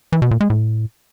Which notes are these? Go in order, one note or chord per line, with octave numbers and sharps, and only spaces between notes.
E3
B2
A#2
G#3
A2